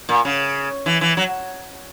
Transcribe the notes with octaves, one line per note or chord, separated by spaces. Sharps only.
A#2
C#3
E3
E3
F#3